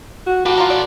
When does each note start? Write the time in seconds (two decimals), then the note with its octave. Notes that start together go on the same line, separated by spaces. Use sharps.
0.27 F#4
0.46 F#4 G4 A4 B4
0.58 F4 A#4
0.70 D5